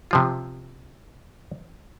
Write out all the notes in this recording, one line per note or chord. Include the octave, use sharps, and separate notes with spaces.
C3 F3 F4